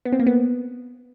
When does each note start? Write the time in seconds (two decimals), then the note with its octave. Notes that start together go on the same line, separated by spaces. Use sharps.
0.05 B3
0.12 C4
0.20 A#3
0.27 B3